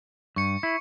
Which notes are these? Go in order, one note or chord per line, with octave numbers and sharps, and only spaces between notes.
G2 C#6 C#7
E4